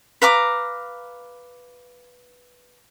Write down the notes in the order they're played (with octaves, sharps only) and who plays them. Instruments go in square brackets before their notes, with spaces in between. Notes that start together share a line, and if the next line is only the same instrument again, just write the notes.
[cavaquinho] B4 F5 A#5 D6